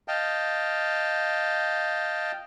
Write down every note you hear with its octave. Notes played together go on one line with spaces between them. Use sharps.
D#5 F5 G5 A5